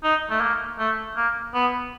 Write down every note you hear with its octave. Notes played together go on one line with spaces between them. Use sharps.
D#4
A3
A#3
A3
A#3
B3